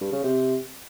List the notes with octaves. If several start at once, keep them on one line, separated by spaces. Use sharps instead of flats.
G2
C#3
C3